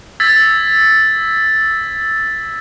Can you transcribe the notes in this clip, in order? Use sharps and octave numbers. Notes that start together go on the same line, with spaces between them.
E6 G#6 A6 B6